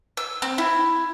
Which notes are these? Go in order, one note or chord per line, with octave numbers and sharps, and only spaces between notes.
E6
C4
E4